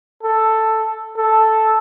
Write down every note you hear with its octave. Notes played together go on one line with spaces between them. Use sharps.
A4
A4